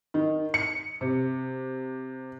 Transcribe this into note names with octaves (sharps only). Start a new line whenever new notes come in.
D#3
C#7
C3